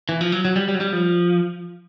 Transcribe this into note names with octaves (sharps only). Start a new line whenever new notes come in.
E3
F3
F#3
F#3
G3
G3
F#3
G3
F3